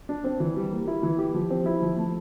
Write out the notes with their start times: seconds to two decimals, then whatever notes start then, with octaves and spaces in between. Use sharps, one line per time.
0.09 D4
0.24 C4
0.40 E3
0.56 G3
0.72 A#3
0.87 E4
1.03 E3
1.18 G4
1.34 F3
1.50 C4
1.66 E4
1.82 F3
1.97 A3